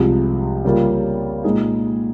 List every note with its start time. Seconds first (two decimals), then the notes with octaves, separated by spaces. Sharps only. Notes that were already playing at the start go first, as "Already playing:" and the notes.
Already playing: C2 C3 F3 G#3
0.65 C#3 G3 A#3 F4
1.44 A#2 G#3 D#4 G#4